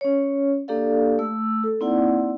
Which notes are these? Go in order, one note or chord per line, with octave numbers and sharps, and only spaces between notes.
C#4 C#5
A#3 D4 G4 A4 D5 F5
A3 E6
A4
A#3 C4 D#4 E4 D5 F#5